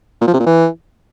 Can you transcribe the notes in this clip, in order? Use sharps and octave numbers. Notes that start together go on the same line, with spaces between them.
A#2
F3
C3
A#2
E3